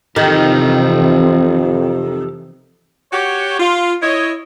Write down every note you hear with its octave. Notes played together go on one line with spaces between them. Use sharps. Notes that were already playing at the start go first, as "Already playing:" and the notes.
F2 C3 D#3 E3 G4 A4
F#4 G4 C#5
F4
E4 C#5 D#5